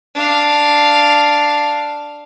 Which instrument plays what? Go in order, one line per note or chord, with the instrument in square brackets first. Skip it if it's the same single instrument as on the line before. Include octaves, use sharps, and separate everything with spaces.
[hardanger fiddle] D4 F5